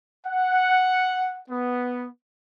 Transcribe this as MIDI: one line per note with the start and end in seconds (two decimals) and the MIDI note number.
0.25 1.41 78
1.49 2.07 59